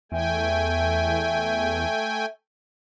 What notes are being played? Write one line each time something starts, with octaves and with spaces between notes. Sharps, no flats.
E2 A3 E5 G5 G#5